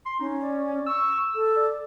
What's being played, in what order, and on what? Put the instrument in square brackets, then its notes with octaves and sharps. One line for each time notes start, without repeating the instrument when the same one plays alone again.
[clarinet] C6
[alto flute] C#4 [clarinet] D#4
[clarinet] D5
[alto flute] C#6 [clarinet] E6
[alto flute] A4
[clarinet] D5